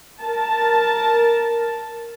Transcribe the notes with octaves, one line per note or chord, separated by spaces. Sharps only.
A#4 A5